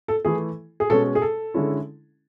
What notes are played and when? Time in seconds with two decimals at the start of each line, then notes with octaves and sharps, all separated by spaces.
0.08 A4
0.25 E3 A3 E4 G#4
0.80 G#4
0.90 B2 G#3 C#4 A4
1.15 G#4
1.22 A4
1.54 D3 G#3 C#4 E4